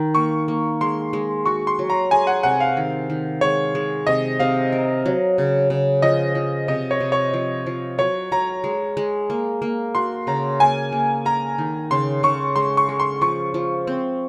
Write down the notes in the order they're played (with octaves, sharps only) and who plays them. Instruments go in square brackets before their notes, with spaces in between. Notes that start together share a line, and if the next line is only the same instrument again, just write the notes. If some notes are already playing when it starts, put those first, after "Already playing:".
Already playing: [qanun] D#3
[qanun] A#3 [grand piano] C#6
[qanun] A#3
[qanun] G#3 [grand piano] C6
[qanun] G#3
[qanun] F#4 [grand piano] C#6
[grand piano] C6
[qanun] F#3
[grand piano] A#5
[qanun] G#4 [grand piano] G#5
[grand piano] F#5
[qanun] C3 [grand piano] F#5
[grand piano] F5
[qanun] D#3
D#3
[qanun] G#3 [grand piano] C#5
[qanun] G#3
[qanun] C3 [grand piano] D#5
[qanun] C3 [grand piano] F5
[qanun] A#4
F#3
C#3
C#3
[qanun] F3 [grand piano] D#5
[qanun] F3
[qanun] C3 [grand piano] D#5
[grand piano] C#5
[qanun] C3
[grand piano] C#5
[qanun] F3
F3
[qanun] F#3 [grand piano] C#5
[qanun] F#3 [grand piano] A#5
[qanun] G#3
G#3
A#3
A#3
[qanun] F#4 [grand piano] C6
[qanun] C#3 [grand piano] A#5
[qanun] A#3 [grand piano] G#5
[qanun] A#3
[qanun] A#4 [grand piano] A#5
[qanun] D#3
[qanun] C#3 [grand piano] C6
[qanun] C#3 [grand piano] C#6
[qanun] G#3 [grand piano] C6
[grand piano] C#6
[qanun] G#3
[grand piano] C6
[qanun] F3 [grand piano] C#6
[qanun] F3
C4